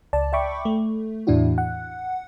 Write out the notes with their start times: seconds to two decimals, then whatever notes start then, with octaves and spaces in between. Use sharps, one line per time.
0.13 C#2 D5 A5
0.33 D5 E5 G5 B5 C#6 D6
0.65 A3
1.27 E2 A2 E3 D4 E4 F#4
1.58 F#5